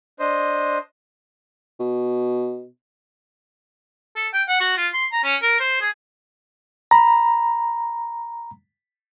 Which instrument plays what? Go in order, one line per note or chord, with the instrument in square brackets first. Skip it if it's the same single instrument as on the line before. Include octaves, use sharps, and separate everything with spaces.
[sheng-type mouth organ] D4 C5 D#5
[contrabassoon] B2
[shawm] A4
G5
F#5
F#4
F4
C6
A#5
C#4
A#4
C5
G#4
[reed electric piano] A#5 B5